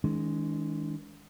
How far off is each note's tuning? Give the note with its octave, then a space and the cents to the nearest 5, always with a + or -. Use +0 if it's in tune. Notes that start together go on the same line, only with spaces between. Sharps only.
D#3 +35 G#3 +0 D4 -40